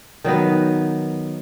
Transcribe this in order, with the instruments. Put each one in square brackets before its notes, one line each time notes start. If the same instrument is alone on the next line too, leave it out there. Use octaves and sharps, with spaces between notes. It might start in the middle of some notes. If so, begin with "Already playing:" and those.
[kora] D#3 F#3 B3